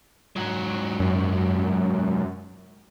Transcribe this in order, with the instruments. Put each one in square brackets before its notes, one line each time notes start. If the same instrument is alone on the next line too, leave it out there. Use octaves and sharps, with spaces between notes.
[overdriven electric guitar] G#2 F#3
[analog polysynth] F#2